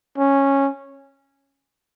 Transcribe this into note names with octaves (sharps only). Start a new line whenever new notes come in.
C#4